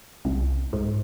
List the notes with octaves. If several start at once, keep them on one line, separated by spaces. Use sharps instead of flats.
C2
G#2